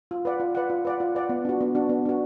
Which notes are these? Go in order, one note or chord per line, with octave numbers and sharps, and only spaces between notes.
F4
B4 D5 F#5
F4
B4 D5 F#5
F4
B4 D5 F#5
F4
B4 D5 F#5
B3
D4 F#4
B3
D4 F#4
B3
D4 F#4